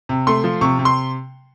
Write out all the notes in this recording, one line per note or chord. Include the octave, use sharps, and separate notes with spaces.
C3
A3 C6
F3
C3 C#6
C3
C6